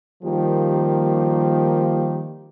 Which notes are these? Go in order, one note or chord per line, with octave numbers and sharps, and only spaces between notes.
D#3 F3 G3 A#3 G4